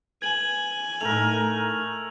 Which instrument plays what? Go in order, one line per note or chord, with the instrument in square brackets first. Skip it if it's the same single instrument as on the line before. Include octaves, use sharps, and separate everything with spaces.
[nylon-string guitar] B4 [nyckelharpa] G#5 [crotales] G#6 F#7
[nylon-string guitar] A2 D#4 A4 [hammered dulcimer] A3 A#4 [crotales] F7